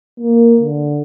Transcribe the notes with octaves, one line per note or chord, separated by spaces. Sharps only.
A#3
D3